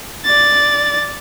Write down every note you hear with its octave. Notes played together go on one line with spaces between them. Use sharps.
D5 A6